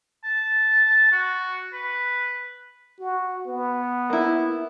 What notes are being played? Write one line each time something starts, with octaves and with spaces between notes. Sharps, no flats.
A5
F#4
B4
F#4
B3
A#3 E4